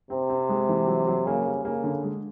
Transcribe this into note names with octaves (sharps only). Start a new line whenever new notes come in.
C3 C4
C4
G#3
E3
F#3
F#3
C#3 A#3
G3
C#3 A#3
D3
G#3